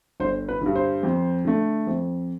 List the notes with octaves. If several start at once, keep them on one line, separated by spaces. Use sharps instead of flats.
G1 C5
B4
G2 D3
C5
F2
D3 A3
F2